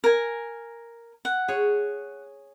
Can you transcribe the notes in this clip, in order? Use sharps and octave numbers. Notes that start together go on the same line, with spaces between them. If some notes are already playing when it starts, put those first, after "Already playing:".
A#4 G#5
F#5
G#4 C#5